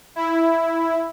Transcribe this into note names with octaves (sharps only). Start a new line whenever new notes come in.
E4